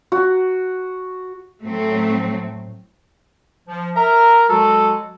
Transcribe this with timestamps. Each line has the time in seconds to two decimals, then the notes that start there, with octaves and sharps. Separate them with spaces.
0.12 F#4
1.63 A2 F#3 A3 C4
3.67 F3
3.96 A#4 E5 A#5
4.49 F#3 G#3 F#4 A4